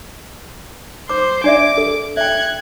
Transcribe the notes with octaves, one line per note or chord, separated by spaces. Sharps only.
C5 D6
D4 D5 E5 D6
A4
E5 G5 F#6 G#6